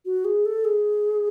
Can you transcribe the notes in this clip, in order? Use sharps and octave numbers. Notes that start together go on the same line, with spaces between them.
F#4
G#4
A4
G#4